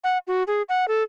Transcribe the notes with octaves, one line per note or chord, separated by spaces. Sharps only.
F#5
F#4
G#4
F#5
A4